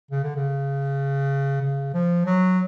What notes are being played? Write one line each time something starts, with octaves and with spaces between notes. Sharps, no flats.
C#3
D3
C#3
C#3
F3
F#3